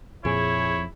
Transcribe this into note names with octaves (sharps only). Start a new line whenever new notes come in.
F2 A#2 E4 G#4 C#5